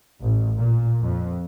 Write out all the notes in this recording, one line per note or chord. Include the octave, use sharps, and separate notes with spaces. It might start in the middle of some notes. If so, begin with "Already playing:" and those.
A1
A#2
F2